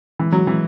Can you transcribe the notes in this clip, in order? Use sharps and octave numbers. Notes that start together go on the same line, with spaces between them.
E3
F#3
E3